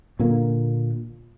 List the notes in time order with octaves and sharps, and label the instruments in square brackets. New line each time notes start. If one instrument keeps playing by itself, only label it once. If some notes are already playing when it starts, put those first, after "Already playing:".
[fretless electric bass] A#2 D3 A#3